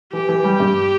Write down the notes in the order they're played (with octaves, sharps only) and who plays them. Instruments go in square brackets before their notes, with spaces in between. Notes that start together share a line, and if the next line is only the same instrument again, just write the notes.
[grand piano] E3 [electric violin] G4
[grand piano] E3
G3
G2